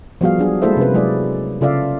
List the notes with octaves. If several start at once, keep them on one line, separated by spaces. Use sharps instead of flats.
F3 G3 B3 F#4 G#4 F5
F#3 D4 G#4
G#3 A#3 E4 A4 C5 E5
C3 C#4 B4
F#3 G#3 E4 G#4 D5
C#3 F4 A4 D5 E5 F5